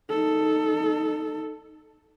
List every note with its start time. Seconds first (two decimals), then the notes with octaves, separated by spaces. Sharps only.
0.10 D#4 A4